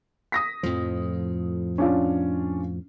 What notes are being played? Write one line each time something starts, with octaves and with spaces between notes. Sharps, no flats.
D#6 A#6 B6
F2 A2 F3
C#4 D4 F4